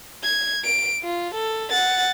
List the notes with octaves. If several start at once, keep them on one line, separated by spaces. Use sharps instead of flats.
G#6
D7
F4
A4
F#5 A6